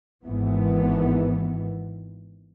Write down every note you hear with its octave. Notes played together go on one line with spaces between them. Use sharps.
G#1 G#2 E3 B3